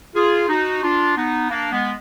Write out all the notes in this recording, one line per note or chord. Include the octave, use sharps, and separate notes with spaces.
F4 G#4
D#4 F#4
D4 F4
B3 D#4
A#3 D4
G#3 B3